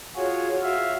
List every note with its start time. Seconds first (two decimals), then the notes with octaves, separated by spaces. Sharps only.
0.16 F4 F#4 G#4 C#5
0.63 F#4 E5 F5